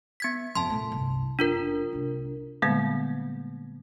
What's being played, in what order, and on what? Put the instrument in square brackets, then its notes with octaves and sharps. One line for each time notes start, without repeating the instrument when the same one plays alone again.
[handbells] B3 G#6 B6
[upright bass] F2 [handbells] A5 C6
[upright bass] A#2 A3
G1 C2
[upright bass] F#1 [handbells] D4 F4 A#4
[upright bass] C2 A2
[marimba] A#2 D3 G3 G#3 A#3 B3